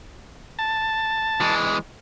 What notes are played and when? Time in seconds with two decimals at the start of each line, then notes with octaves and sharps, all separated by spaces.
0.59 A5
1.40 E3 G#3